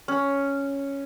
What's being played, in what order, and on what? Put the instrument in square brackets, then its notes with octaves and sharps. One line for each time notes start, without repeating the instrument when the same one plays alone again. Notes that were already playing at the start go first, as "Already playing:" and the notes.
[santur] C#4